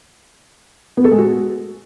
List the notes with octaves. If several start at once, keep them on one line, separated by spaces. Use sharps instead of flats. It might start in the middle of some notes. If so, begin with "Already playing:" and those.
B3
A4
G#3
F#4